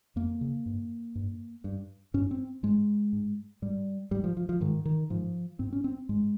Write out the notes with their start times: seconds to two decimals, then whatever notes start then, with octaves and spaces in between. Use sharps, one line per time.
0.16 F2 A#3
0.41 C#3
0.66 G2
1.15 G2
1.64 G2
2.14 G2 C#4
2.31 C4
2.63 G#2 G#3
3.13 G#2
3.62 G#2 G3
4.11 G#2 G3
4.24 F3
4.37 F3
4.49 F3
4.61 G#2 D#3
4.85 D#3
5.10 G#2 F3
5.59 G#2 C4
5.73 C#4
5.84 C4
6.09 G#2 G#3